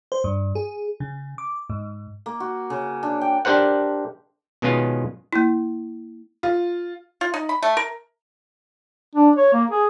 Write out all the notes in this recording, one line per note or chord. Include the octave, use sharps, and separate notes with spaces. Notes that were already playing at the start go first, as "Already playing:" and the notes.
C5
G2
G#4
C#3
D6
G#2
A#3
F#4
C#3
D4
G5
D4 G4 A#4 C5 F#5
B2 D#3 G#3 B3 C#4 F4
A#3 E4
F4
F4
D#4
B5
A3
A#4
D4
C#5
A#3
G#4